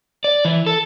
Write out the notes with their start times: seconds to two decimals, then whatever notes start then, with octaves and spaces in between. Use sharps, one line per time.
0.24 D5
0.45 E3
0.66 A4